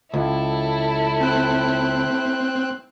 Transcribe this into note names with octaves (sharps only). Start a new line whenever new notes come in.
C#2 E4 A4
C4 F#6